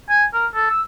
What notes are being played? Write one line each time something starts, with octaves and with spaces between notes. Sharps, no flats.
G#5
A#4
A4
E6